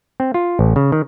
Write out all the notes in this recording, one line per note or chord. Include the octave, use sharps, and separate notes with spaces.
C4
F4
A1
C#3
D#3